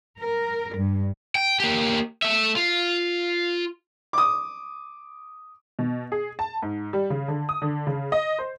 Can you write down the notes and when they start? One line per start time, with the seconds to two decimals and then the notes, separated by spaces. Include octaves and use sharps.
0.19 A#4
0.77 G2
1.35 G5
1.60 A#3 G4
2.22 A3 E5
2.56 F4
4.13 D6 D#6
5.79 B2
6.12 G#4
6.39 A5
6.62 G#2
6.93 G3
7.10 C#3
7.28 D3
7.49 D#6
7.62 D3
7.87 C#3
8.12 D#5
8.39 C5